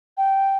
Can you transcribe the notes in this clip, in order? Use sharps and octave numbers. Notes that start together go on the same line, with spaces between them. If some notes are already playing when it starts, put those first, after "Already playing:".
G5